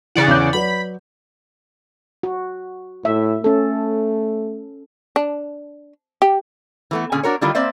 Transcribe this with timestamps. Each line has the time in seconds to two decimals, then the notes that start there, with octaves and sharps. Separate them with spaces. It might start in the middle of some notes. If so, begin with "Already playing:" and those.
0.15 C#3 E3 D5 F#5
0.28 E2 C#4 G6
0.53 F#3 B4 D5 B5
2.23 F#4
3.05 A2 E5
3.44 A3 C#4 A4
5.16 D4
6.22 G4
6.91 E3 A3 B3
7.12 A#2 D3 C#4 G#4 G#5
7.23 D4 F#4 A#4 C#5
7.41 D3 D#3 G3 E4 F4 A#4
7.55 A#3 C4 C5 D5 E5